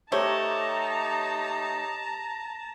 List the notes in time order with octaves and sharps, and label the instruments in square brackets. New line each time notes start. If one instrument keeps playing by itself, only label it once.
[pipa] A3 C5 [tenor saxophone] D#4 [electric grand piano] G4 C#5 [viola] A5 A#5